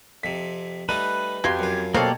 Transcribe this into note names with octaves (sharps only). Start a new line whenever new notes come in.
F2 C3 B6
G3 A3 D#4 B4 D#7
F2 F#4 G4 F5 C6 G#6
F#2 F4
B2 A#3 C4 G4 A4 C#5 D5 F5